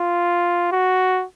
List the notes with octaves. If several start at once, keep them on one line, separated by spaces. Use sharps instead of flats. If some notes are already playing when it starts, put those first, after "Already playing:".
Already playing: F4
F#4